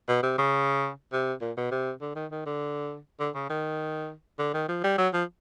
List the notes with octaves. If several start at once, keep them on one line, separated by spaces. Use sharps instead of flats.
B2
C3
C#3
C3
A#2
B2
C3
D3
D#3
D#3
D3
D3
C#3
D#3
D3
D#3
F3
G3
F#3
F3